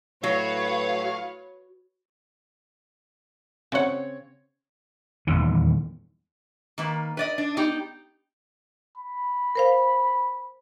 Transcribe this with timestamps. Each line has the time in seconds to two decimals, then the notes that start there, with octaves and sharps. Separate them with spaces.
0.24 A2 F#3 B4 C#5 F5
3.72 C#3 C4 C#5 F#5
5.27 D#1 A1 E2 D#3
6.78 D#3 A#3 B4
7.17 B4 D5 D#5
7.38 D4
7.57 B3 D#4 G4
8.97 B5
9.55 A#4 C5 F5